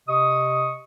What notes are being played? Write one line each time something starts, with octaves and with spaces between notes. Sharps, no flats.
C3 D#5 C#6 D#6